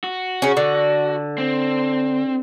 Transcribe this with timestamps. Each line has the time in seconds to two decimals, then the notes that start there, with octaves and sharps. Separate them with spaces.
0.04 F#4
0.42 C#3 C#4
0.57 D3
1.38 C4